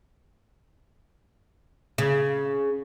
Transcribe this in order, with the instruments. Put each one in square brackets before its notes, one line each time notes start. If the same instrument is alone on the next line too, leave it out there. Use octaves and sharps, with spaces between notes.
[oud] C#3